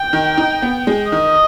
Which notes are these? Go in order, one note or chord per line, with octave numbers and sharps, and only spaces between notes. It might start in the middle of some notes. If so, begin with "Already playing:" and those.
Already playing: G5
D#3
D#4
B3
G#3
D#3 D#5